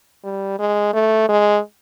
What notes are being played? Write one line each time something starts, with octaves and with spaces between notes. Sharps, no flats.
G3
G#3
A3
G#3